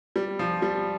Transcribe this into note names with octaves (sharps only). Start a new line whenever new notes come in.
G3
F3
G3